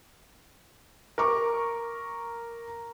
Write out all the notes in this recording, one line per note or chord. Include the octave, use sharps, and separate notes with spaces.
A#4 C#6 D6